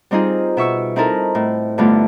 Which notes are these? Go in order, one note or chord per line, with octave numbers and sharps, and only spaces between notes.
G3 C4 D#4 F4 G#4
B2 E5 C#6 E6
C4 D#4 E4 A4 A#4
A2
G2 D3 A3 B3 F4